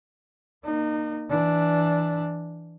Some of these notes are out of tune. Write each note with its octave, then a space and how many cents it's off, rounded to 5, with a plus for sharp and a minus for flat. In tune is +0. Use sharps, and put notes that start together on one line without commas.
A#3 +0 D#4 -30
E3 +0 D4 +0